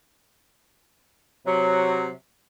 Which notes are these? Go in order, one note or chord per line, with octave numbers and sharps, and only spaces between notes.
C3 F#3